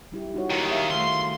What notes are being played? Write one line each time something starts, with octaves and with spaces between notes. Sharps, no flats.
G3 E4 G4
D#4 F#4 C#5
D#2 D#3
G#4 E5 F5
D#3 A3 C6